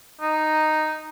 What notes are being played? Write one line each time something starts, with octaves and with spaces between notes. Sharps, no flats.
D#4